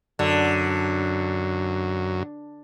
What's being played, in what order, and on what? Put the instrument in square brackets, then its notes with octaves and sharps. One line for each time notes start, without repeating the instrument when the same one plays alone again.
[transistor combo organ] F#2 [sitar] D3